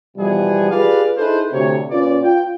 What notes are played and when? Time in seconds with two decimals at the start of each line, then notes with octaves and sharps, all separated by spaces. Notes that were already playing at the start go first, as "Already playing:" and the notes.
0.17 B2 E3 F3 G3 B3 G#4
0.71 F4 G4 G#4 B4 D5 F5
1.17 D#4 E4 G#4 A4 B4 C5
1.52 D2 C3 C#5
1.91 A#2 C#4 F4 B4 D5
2.23 F4 G5